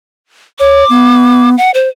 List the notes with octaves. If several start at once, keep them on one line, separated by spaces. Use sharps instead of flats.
C#5 D6
B3
F#5
C5